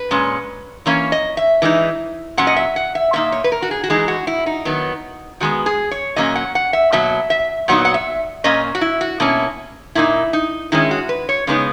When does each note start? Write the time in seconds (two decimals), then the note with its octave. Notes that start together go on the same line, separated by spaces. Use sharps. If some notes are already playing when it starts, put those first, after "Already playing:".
Already playing: B4
0.11 A#2 G#3 C#4
0.86 E3 A#3 C#4 C#5
1.12 D#5
1.37 E5
1.62 E3 G#3 B3 D#4
2.37 A#2 F#3 C#4 F#5
2.47 D#5
2.56 E5
2.76 F#5
2.95 E5
3.13 A#2 A#3 D#4 E5
3.32 C#5
3.44 B4
3.52 A#4
3.62 F#4
3.71 G#4
3.84 F#4
3.90 E3 G#3 D#4 G#4
4.08 F#4
4.27 E4
4.46 D#4
4.65 D#3 F#3 B3
5.40 D#3 G#3 B3 F#4
5.66 G#4
5.91 C#5
6.16 A#2 F#3 A#3 C#4 D#5
6.36 F#5
6.55 F#5
6.73 E5
6.92 B2 F#3 A#3 E5
7.30 E5
7.68 A#2 F#3 B3 D#4 F#5
7.85 F#5
7.94 E5
8.44 A#2 A#3 C#4 D#5
8.75 F#4
8.81 E4
9.01 F#4
9.20 B2 A#3 C#4 E4
9.95 A#2 A#3 D#4 E4
10.33 D#4
10.72 D#3 G#3 C#4 E4
10.91 F#4
11.09 B4
11.29 C#5
11.47 C#3 G#3 B3 D#4 C#5